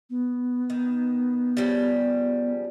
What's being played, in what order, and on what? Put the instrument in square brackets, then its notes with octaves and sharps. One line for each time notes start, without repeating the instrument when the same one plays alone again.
[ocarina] B3
[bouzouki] D#3
C#3 F3 G3